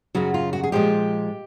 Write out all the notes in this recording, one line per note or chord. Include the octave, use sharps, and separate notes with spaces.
F#2 C#3 F#3 F#4
F4
F#4
G#4
A#2 F3 G#3 G4